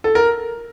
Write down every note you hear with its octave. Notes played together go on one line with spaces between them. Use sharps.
A4
A#4